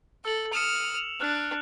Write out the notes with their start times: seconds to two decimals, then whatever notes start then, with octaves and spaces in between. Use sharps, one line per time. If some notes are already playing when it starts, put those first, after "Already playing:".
0.25 A4 E6 F#7
0.53 D#6 F6 C#7 E7 F7
1.20 D4 F6 F#6